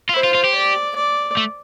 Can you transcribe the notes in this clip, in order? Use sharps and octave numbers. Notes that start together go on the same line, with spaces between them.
F4
E4 C5
F4
F4
G4
D5
D5
A3